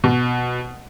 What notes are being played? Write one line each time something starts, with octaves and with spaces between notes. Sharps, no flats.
B2